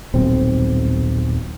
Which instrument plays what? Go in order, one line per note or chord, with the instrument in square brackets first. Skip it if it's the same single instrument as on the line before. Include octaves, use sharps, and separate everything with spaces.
[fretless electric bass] D#1 B1 C4